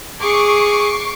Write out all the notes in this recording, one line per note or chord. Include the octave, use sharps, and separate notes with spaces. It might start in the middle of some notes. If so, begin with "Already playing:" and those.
G#4 C#6 D6 C7